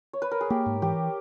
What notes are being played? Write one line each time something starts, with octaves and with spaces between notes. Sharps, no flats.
C#5
B4
A#4
G#4
A#3 G4
G#2
E3 G4